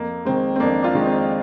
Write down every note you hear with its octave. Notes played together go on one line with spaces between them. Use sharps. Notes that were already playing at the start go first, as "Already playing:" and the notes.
Already playing: F2 A#3
D#3 G#3 C4
C4
F2 A#3 D4
D4 F4
D#3 G#3
C4